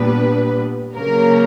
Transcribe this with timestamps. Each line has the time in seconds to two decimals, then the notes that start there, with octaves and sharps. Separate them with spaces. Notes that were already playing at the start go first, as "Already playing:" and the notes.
Already playing: A#2 G3 B3 D4 B4
0.95 C#3 F#3 A#3 C#4 A#4